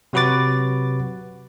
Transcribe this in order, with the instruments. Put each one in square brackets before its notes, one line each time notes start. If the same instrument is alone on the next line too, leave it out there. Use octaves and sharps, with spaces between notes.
[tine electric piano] C3 F#3 F#4 B4 D6 A6